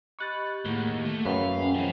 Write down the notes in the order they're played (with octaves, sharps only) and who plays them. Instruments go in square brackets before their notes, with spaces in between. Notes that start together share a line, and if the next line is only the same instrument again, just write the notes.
[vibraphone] G4 D#5 B5 [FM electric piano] C#6 F#6 A6
[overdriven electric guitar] D#2 [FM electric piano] A2 [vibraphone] G#4 F#5
[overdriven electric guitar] A3
[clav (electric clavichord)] F#2 [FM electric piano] B4 B5 [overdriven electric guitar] F5
[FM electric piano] G#3 C#4 [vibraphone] F#5 G5
[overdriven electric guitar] E3 F3